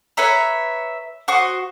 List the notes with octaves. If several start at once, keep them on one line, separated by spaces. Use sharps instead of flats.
B4 C#5 E5 A#5
F#4 C5 C#6 D#6